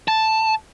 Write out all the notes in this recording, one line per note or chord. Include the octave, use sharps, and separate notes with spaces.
A5